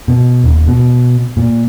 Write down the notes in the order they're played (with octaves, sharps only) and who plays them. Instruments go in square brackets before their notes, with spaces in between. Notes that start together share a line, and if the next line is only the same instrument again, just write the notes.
[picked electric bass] B2
D#1
B2
A#2